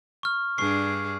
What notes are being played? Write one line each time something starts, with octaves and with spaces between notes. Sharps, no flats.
C#6 F6
G2 D4 G#4 C#6 C7